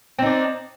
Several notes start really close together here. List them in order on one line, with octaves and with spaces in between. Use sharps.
C4 D#4 D4